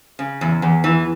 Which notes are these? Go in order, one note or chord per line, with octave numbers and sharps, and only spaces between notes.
C#3
E2
E2
E3